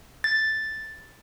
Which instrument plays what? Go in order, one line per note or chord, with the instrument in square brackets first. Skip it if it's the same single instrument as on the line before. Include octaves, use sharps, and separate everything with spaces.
[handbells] A6